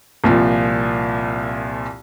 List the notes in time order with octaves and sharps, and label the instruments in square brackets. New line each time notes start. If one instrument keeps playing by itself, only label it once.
[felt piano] C2 A#2 F3